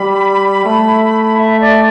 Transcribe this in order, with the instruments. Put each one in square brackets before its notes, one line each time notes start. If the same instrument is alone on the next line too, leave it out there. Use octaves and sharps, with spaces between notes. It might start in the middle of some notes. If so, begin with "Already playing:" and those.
Already playing: [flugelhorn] G3 [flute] B5
[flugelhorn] A3
[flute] E5
D5